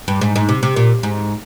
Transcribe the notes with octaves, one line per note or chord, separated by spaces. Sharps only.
G2
G#2
G#2
C3
C3
A#2
G#2